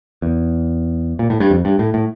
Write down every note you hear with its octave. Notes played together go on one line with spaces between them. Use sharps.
E2
A#2
A2
G2
F2
G2
A2
A2